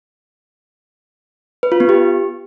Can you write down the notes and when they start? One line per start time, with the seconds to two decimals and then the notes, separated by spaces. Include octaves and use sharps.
1.63 B4
1.72 F4
1.80 B3
1.89 G4